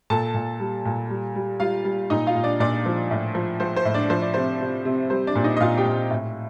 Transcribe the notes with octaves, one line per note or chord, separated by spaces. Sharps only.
A#2 A4 A5
A#2
G3
A#2
G3
G3
G3 F4 F5
G3
A#2 D#4 D#5
F4 F5
A#2
D4 D5
A#2 D4 D5
F3
A2
F3
F3 C5
C5
A2
D4 D5
F3 C5
D5
C3 C5
C3
C3
G3 C5
D4 D5
A#2
D#4 D#5
D#5
A#2 F4 F5
G4 G5
A#2
A2